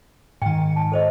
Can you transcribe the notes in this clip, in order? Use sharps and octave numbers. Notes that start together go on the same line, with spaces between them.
G#2 D#3 G5
A5
A4 C5 D#5